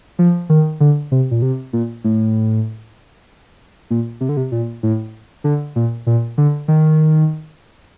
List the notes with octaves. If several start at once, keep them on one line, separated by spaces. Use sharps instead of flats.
F3
D#3
D3
C3
A#2
C3
A#2
A2
A#2
C3
D3
C3
A#2
A2
D3
A#2
A#2
D3
D#3